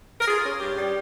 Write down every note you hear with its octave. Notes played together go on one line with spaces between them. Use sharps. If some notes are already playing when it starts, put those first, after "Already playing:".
A#4
F4 G#4
C#4
G2 G4
G3